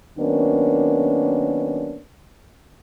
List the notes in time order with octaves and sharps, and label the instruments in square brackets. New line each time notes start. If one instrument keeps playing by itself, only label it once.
[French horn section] D#3 F#3 A#3 B3 C#4 D4